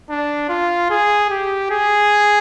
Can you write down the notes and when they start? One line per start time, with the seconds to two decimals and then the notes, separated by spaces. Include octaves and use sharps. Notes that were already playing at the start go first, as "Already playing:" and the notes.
0.10 D4
0.49 F4
0.90 G#4
1.30 G4
1.70 G#4